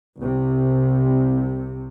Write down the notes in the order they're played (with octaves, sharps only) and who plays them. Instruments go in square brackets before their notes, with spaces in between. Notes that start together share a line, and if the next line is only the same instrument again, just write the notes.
[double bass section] C2 C3